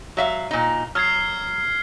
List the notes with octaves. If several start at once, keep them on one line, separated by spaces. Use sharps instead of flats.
F#3 E5 F5
A#2 D#4
F#3 F6 G#6 C7